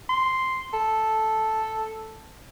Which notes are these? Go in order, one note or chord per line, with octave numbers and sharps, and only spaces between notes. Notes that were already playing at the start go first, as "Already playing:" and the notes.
C6
A4